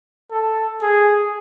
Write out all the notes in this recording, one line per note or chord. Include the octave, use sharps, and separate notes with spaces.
A4
G#4